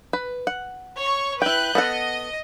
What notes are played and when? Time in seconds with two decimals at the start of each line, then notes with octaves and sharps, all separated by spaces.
0.13 B4
0.47 F#5
0.97 C#5 C#6
1.42 E4 B4 G5 F#6 G6
1.75 B3 A4 D#5 F#5